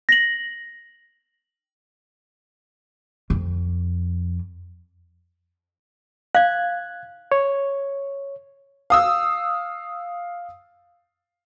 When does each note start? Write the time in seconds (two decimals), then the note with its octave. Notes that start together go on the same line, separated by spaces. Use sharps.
0.09 A#6 F#7
3.30 F2
6.35 F5 F#6 G#6
7.32 C#5
8.90 F5 D#6 E6